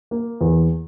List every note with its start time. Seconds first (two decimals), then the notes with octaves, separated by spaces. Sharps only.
0.11 A#3
0.41 E2